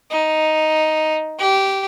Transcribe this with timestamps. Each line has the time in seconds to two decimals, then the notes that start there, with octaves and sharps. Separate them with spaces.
0.11 D#4
1.39 G4